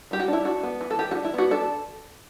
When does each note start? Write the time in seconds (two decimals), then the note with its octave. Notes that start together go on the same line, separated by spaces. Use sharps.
0.11 G3 G4
0.20 F#4
0.28 D4
0.33 E4
0.45 D4 F#4
0.63 B3
0.81 E3
0.90 A4
0.99 E3 G4
1.11 F#4
1.15 D4
1.25 E4
1.34 B3 F#4
1.51 D4 A4